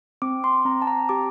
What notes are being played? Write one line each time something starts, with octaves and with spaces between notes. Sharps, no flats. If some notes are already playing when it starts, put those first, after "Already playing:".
C4 D6
C6
C4 A#5
A5
A#5
G4 D6